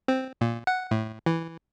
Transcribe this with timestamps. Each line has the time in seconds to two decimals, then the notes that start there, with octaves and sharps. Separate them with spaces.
0.08 C4
0.41 A#2
0.67 F#5
0.91 A2
1.26 E3